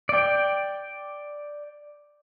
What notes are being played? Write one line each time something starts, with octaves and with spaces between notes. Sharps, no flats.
D5 G5